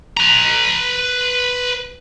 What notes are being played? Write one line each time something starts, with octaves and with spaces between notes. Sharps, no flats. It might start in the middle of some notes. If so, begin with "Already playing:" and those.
B4 A#5